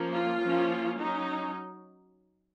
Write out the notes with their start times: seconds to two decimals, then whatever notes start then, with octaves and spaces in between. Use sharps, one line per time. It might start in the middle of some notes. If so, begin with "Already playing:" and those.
Already playing: F3 A#3 C#4
0.12 F4
0.41 F3 A#3 C#4
0.99 F#3 C#4 D#4